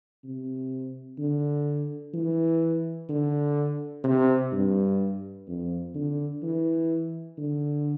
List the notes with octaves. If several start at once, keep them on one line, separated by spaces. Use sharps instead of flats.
C3
D3
E3
D3
C3
G2
F2
D3
E3
D3